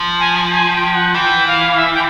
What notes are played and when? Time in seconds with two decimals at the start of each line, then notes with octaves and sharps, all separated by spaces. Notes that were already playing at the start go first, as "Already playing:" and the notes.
Already playing: F3
0.20 G#5
0.52 G#5
0.73 G5
0.95 F#5
1.14 E3 G5
1.47 F5
1.78 E5
1.94 G5